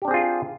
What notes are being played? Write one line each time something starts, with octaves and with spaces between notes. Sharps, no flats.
C4 D4 F4 G4 G#4